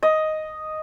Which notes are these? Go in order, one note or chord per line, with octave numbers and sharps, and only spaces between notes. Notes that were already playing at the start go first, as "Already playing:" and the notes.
D#5